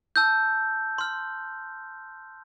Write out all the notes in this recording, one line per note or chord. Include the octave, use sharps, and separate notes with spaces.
A5 E6 G6
C6 F6